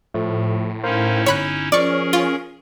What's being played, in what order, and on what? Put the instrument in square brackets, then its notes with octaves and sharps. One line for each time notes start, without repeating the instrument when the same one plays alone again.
[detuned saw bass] A2 [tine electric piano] F3 A3
[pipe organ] C#4 D#4 E4 [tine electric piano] A#4 C5 F5
[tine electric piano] G1 [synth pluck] C#5 B5 F#6
[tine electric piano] F3 [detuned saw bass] C#4 [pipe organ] G#4 A#4 [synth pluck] D5 C#6
[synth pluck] F4